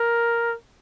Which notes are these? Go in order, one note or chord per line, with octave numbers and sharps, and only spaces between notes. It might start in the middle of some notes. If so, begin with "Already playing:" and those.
Already playing: A#4